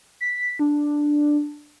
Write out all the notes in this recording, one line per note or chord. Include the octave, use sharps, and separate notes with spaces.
B6
D4